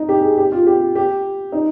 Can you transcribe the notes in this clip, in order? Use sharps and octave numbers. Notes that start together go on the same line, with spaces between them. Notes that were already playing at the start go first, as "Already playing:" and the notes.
Already playing: D#4
G4
G#4
G4
F4
G4
G4
D#4